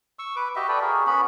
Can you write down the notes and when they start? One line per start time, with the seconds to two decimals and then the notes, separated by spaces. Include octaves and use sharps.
0.19 C#6 E6
0.36 B4 D6
0.56 F#4 G4 D#5 E5
0.68 A4 B4 D5 G5
0.81 F#4 G#4 A#4
1.07 B3 C#4 F#4 B5